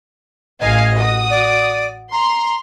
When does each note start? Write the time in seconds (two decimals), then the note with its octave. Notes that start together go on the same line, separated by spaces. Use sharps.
0.61 A1 D#5 F5 G#5
0.98 F#4 D#6
1.30 D5
2.12 A#5 C6